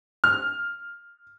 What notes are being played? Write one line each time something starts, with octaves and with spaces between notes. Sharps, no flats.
F6